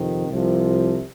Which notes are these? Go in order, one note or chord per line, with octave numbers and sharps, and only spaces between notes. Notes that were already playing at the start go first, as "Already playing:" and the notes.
Already playing: F2 C3 D#3
C2 C3 F3